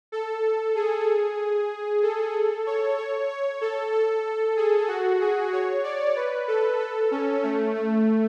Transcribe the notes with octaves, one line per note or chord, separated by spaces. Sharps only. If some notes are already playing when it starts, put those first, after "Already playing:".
A4
G#4
A4
C#5
C#5
C#5
A4
A4
G#4
F#4
G#4
C#5
D5
B4
A4
A4
C#4
A3
A3